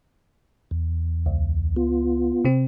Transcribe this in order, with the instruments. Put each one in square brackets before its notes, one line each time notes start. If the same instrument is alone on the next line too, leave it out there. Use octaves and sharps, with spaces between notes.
[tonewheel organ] E2
[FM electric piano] C#2
[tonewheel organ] B3 F4
[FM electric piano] C3 C4